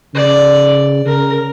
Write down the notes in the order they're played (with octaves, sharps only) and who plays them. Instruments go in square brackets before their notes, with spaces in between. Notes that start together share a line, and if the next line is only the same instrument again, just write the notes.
[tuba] C#3 [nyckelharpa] D5
[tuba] C#3 [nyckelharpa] A#4